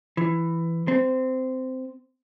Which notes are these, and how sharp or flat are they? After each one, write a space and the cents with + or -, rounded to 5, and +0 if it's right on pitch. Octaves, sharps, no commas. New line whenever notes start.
E3 +10
C4 -15